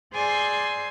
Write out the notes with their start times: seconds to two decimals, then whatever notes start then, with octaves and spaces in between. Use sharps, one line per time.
0.12 G#4 C5 D5 G#5 C6 E6